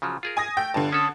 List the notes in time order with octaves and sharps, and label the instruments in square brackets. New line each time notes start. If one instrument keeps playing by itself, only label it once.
[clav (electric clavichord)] C#3 F3 F#3
F4 G#4 A#4
[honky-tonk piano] G#5 D#6 A#6
[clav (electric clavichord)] A3 [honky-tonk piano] G5
[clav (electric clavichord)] G1 G2 [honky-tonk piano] D3 A5
[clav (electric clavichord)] C#4 A4 [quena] D#6